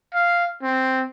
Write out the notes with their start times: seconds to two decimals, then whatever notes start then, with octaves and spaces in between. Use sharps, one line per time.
0.14 F5
0.63 C4